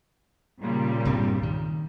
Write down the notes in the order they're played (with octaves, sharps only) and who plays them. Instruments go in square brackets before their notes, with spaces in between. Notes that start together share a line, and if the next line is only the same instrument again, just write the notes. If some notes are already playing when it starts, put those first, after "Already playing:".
[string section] A#2 C#3 G3
[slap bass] C2 G2 C4
D#3